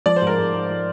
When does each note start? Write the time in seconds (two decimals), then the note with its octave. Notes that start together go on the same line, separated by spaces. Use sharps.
0.06 F3 D5
0.16 C5
0.22 G#2
0.27 A#4
0.38 G#2
0.54 G#2
0.70 F3